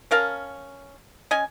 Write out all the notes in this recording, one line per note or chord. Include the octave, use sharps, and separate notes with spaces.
C#4 A#4 F5 A5
C#4 D#5 G#5